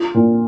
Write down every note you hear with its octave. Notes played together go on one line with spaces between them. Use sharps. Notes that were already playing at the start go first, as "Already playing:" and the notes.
Already playing: F4
A#2